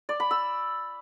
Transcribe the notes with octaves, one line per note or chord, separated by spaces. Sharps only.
D5
B5
E6